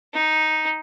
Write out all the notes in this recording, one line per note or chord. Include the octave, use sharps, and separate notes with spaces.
D#4